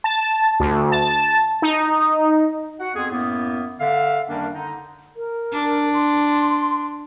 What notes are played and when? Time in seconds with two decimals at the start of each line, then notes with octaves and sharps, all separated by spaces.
0.04 A5
0.60 D2
0.92 A5
1.62 D#4
2.80 F#4 F#5
2.95 F2 B3 G#4
3.11 F#2 A2 A#3 B3
3.80 D3 E5 F5
4.29 F#2 D#3 G3 A#3 C#4 D4
4.54 D3 D#4
5.16 A#4
5.53 D4
5.93 C6